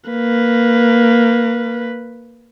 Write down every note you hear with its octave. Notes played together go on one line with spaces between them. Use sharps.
A#3 B4